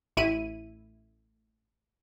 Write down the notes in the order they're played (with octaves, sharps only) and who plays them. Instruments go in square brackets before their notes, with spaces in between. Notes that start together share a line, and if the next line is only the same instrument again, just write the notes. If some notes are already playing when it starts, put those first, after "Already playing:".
[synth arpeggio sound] A1 E4 D#7